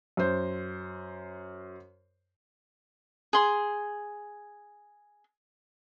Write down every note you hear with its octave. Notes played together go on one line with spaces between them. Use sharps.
F#2 C5
G#4 C6